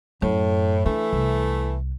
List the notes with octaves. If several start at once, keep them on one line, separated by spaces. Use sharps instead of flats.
F#2 A2
E3 A3 D4
C2